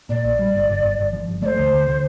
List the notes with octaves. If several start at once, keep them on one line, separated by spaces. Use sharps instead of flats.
A#2 D5
A#1
G3
G1
G1
G1
G1
F3
G1
A3 C5 D5
D2
D2
D3